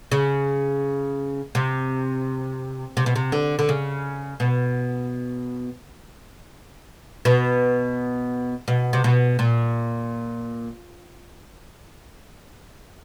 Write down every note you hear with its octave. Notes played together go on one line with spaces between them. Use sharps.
C#3
C3
C3
B2
C3
D3
D3
C#3
B2
B2
B2
C3
B2
A#2